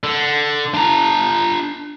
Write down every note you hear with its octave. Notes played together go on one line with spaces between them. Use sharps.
D3
D4 A#5